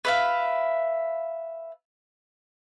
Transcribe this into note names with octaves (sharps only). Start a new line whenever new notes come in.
B4 E5 F5